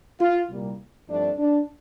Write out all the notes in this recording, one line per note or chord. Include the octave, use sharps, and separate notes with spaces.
F4
C2 A#2 G3 A#3
G2 F3 A3 C4 D4
D4